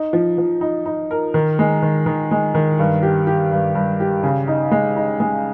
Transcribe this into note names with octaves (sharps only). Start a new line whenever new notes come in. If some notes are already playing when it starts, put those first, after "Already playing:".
Already playing: D#4
F3
F3
D#4
D#4
A#4
D#3
G#3
D#3
D#3
G#3
D#3
G2
G4
G4
G2
G2
G4
C#3
D#4
G#3
D#4
G#3